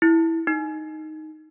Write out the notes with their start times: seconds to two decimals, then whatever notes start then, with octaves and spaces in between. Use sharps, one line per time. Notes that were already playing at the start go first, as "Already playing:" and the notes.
0.02 E4
0.47 D#4